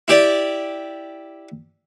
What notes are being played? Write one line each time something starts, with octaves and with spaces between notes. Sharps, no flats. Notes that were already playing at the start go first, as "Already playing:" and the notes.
E4 G4 D5